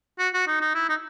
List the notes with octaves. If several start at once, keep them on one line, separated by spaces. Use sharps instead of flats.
F#4
F#4
D#4
D#4
E4
D#4